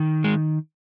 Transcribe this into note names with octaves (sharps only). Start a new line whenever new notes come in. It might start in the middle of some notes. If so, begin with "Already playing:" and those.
Already playing: D#3
G#3